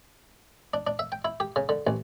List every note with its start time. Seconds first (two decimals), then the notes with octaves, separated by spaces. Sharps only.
0.74 D4
0.87 D4
0.99 E5
1.12 G5
1.25 E4
1.40 G4
1.56 C#3
1.69 D3
1.87 A1